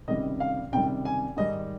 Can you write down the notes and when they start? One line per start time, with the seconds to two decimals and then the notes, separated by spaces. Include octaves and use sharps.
0.08 C#2 C3 D#3 G3 D#5
0.40 F5
0.72 C#2 C3 D#3 G3 G5
1.05 G#5
1.37 G#2 D#3 G3 D#5